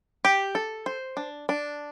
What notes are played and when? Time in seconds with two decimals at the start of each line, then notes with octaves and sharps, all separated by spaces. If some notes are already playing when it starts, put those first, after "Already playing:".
0.25 G4
0.55 A4
0.86 C5
1.17 D4
1.49 D4